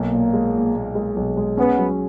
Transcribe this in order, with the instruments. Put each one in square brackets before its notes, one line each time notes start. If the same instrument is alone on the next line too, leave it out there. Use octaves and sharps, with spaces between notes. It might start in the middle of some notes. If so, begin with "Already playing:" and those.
Already playing: [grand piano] B1 [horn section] A#3
[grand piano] A#2
G#3
A#2
A#2
G#3
B1
G#3
[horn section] B3 [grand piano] C#4
[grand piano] F#3